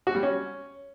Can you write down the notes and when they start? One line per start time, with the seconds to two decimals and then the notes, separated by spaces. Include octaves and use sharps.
0.07 F#4
0.15 G3
0.23 C#4